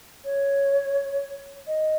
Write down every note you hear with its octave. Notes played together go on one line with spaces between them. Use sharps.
C#5
D#5